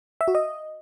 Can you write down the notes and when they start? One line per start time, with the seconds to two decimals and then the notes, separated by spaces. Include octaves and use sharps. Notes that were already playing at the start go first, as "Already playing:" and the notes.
0.21 E5
0.28 F#4
0.35 D#5